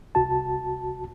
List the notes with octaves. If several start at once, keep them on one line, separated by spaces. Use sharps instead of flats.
C2 F#4 A5